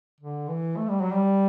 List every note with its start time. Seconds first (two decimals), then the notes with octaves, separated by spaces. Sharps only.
0.20 D3
0.48 E3
0.77 A3
0.88 G3
1.01 F#3
1.13 G3